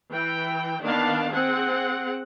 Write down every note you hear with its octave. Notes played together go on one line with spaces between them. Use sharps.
E3 G5
D#3 A#3 B3 D4 F5 A5
C4 G#4 F#5